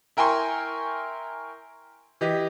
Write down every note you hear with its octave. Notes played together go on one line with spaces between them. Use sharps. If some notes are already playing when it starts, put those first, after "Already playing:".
E4 A#4 G5 G#5 C6 C#6
E3 G4 D#5